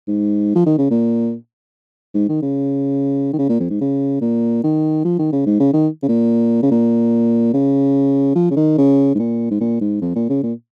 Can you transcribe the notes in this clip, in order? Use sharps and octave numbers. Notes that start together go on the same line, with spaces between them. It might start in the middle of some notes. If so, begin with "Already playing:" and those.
G#2
F3
D#3
C#3
A#2
G#2
D#3
C#3
D#3
C#3
A#2
F2
G#2
C#3
A#2
D#3
F3
D#3
C#3
G#2
C#3
D#3
C#3
A#2
C#3
A#2
C#3
F3
C#3
D#3
C#3
G#2
A#2
G#2
A#2
G#2
F2
A#2
C#3
A#2